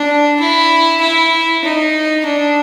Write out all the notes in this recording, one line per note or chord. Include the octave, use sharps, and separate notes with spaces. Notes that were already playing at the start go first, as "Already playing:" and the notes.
Already playing: D4
E4
E4
D#4
D4